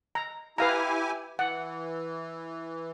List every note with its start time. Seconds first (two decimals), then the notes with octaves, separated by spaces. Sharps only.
0.15 A#5
0.58 E4 G4 B4 F5 G#5 A#5
1.39 E3 F#5